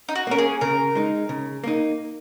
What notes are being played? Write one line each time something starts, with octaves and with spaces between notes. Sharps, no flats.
D#4
F#4
A#3 C#4 A#4
G#4
C#3 A#4
G#3 D#4
C#3
A#3 D#4